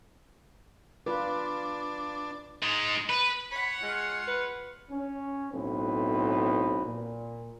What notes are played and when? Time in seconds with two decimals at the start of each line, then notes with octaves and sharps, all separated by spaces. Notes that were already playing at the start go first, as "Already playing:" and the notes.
1.06 D4 F4 B4
2.62 G#2 G#3
3.10 B4
3.51 C#5 F#5 B5
3.82 G#3 F4
4.28 B4
4.91 C#4
5.52 B1 A2 B3 C4 B4
6.85 A#2